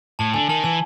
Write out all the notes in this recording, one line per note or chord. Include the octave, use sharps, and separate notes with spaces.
A2 A5
D3 G#5
D#3 A5
E3 G#5